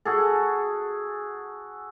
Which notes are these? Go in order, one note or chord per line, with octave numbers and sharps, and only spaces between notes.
F#4 G#4 A4